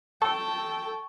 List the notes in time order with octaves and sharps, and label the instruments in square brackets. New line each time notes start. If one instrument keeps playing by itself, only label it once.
[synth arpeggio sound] A4 [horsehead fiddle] G5 A5 [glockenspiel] C#6